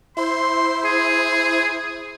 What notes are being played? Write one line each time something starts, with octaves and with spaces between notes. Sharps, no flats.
E4 C5 C6
G#4